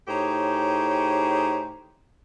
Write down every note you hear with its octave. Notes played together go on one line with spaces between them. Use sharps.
A2 D#4 G4 G#4 C5 C#5